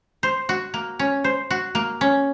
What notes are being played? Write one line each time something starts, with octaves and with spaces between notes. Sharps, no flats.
C5
F#4
A#3
C#4
C5
F#4
A#3
C#4